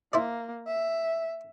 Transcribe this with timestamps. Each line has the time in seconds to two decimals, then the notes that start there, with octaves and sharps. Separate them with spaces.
0.13 A#3 E4 C5 D5
0.67 E5